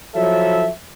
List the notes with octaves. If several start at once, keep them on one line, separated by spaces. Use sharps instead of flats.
F3 F#3 E4 A4 E5